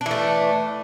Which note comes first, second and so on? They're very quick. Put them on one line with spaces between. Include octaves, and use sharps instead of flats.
D4 E3 A3